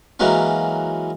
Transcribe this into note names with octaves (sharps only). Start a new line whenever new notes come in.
E3 F#3 G#3 A#3 C#4